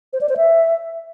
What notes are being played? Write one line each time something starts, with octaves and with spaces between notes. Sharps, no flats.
C5
D5
C5
E5